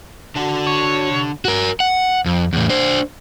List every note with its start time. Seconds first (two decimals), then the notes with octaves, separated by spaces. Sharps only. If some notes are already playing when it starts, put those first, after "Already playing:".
0.36 D3 D4 F#4 F#5
0.67 C#5
1.11 C3
1.45 F#4 A#4
1.80 F#5
2.26 F2
2.53 E2 A2
2.69 D4 C5